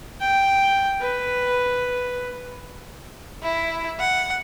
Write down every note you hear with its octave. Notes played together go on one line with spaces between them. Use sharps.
G5
B4
E4
F#5